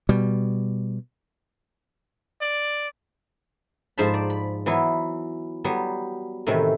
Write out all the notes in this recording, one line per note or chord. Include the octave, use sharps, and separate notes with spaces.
B2 G3
D5
G#2 F3 C5 A5 B5
D5
B5
E3 F#3 B3 E4
F#3 G3 B3
A2 C3 D#3 E3